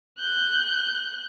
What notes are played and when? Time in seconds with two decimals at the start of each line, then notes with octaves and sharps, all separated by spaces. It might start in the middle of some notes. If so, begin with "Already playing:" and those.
0.20 F#6 G6